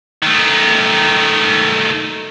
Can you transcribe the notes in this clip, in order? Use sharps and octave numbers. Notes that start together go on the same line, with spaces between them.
D#3 A3